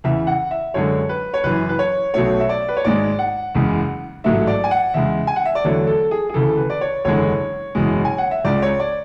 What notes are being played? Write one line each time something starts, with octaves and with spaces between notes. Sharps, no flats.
E2 C#3 E3 E5
F#5
E5
F#2 D3 G#3 C#5
B4
C#5
F#1 F#2 E3 B4
B4
C#5
B1 B2 A3 C#5
E5
D5
B4
C#5
G#1 G#2 G#3 D5
F#5
F#1 E2 C#3 G#3
A1 G#2 F#3 A3 E5
D5
G#5
F#5
E2 C#3 G#3 E5
G#5
F#5
E5
D5
E2 D3 F#3 A3 C#5
A4
G#4
G#4
D2 C#3 E3 A4
B4
D5
C#5
F#1 E2 D3 G#3 C#5
F#1 E2 B2 G#3
G#5
F#5
E5
C#2 C#3 G#3 D5
C#5
D5